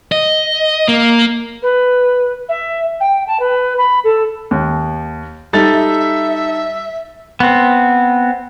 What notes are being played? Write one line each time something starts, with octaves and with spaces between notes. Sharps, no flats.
D#5
A#3
B4
E5
G5
A5
B4
B5
A4
D#2
G3 D#4 A4 E5 A6
B3 C4